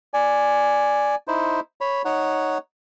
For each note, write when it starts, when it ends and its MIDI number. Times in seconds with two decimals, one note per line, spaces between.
0.14 1.15 74
0.14 1.15 80
1.28 1.60 63
1.28 1.60 64
1.28 1.60 72
1.81 2.02 73
1.81 2.02 83
2.05 2.58 63
2.05 2.58 73
2.05 2.58 78